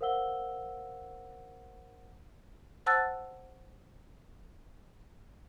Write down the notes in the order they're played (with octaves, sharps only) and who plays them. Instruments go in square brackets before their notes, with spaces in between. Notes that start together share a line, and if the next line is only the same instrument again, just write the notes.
[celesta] A#4 C5 F5 F#5 E6 G7
[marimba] C5 F#5 A5 E6 F#6 A6